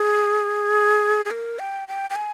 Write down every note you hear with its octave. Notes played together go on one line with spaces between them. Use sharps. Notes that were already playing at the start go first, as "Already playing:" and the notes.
Already playing: G#4
G#4
A#4
G5
G5
G5
G#5